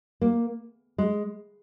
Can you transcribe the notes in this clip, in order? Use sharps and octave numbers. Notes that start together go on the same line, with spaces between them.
A#3
G#3